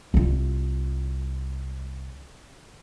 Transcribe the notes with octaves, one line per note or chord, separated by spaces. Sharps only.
C2 F4